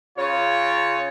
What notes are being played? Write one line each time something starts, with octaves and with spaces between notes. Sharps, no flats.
C#3 F4 C#5